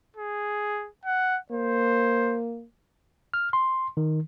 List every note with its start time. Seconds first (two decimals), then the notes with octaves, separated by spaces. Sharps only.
0.17 G#4
1.05 F#5
1.52 A#3 C5
3.34 F6
3.53 C6
3.97 D#3